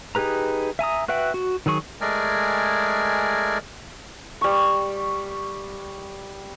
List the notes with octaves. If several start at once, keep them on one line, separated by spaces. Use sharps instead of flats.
D#4 G4 G#4 B4 A#5
E5 G#5 A#5 D#6
F#4 B4 E5 F#5 G5
F#4
D#3 F#3 G#4 C#6
G#3 A3 G#4 A#4 D5 G#5
G3 C#6